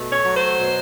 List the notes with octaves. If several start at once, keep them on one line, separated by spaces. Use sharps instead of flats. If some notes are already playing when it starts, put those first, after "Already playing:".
Already playing: B2 A3
C#5
F#3
C5
B2